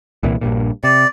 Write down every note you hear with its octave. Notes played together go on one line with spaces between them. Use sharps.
C2 A#2 E3
A#1 G2 A#2
C3 D5